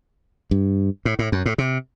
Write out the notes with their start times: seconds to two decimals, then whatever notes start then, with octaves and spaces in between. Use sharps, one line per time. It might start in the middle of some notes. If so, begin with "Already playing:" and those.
0.51 G2
1.05 A2
1.19 A2
1.32 F#2
1.46 A2
1.58 C3